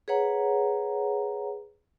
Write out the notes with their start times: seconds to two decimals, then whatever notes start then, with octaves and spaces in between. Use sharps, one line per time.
0.08 G#4 B4 C#5 F#5 A#5